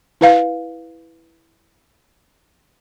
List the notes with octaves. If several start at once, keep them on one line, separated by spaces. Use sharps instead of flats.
E4 B4 F5